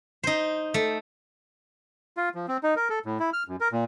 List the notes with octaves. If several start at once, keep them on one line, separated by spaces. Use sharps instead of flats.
D#4 C5
A3
F4
F3
C4
D#4
A#4
A4
A2
E4
F6
F#2
A#4
A#2